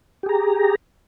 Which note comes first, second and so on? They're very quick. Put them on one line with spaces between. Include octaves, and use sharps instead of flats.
G4 G#4 A#5